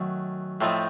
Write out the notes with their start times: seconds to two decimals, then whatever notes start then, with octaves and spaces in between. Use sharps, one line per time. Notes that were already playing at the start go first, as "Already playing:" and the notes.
Already playing: F#2 D#3 F#3 A3
0.61 A2 F3 A3 C4 D#4